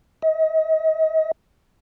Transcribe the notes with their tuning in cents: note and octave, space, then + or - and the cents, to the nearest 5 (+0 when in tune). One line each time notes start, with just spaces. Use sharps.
D#5 +35